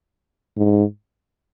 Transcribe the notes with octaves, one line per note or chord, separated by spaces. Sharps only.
G#2